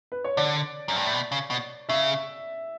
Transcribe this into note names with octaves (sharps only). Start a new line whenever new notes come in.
B4
C#5
D3 D5
F#2
G2
A2
B2
C#3
B2
C#3 E5